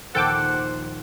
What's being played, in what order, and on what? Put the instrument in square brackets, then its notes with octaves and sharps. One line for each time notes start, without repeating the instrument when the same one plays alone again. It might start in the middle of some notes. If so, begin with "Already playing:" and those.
[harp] A#1 D#2 [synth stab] A4 G5 D6 [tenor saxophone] C5 [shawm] F#5